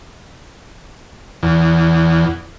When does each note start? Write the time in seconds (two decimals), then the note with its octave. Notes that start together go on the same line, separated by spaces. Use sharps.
1.43 E2